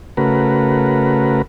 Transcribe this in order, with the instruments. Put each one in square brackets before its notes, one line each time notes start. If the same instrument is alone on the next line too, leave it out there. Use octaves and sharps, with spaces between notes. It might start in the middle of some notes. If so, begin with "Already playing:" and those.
[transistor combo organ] C#3 A3 F#4 A#4 B4